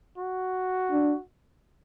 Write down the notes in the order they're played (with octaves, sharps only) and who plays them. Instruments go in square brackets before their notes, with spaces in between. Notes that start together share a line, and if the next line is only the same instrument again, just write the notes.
[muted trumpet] F#4
[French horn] D4